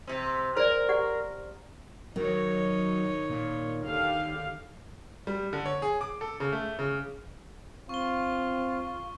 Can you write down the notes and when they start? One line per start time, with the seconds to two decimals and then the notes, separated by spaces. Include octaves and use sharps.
0.07 C3 C4
0.57 A#4 C5 D5
0.89 G4 D5 F#5
2.16 D#3 F#3 D#4 C#5
3.30 A#2
3.85 D#2 D3 G4 F5
5.27 G3
5.53 D3
5.66 C#5
5.82 G#4
6.01 D6
6.21 A4
6.40 C#3
6.52 A3
6.79 C#3
7.89 C4 F4 C#6 G7